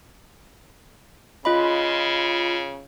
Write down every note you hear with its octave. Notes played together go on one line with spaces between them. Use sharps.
C#3 F4 D#5 B5